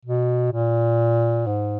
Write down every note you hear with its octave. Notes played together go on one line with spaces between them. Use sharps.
B2
A#2
G#2